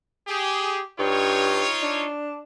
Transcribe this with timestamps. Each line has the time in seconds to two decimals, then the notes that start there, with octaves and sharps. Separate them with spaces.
0.28 G4 G#4
0.99 G2 D#4 F4 C#5
1.83 D4